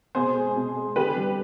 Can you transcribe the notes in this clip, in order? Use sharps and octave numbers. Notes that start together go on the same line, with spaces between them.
B2 G#4 C5
G#3
B2
G#3
D3 G4 B4
G3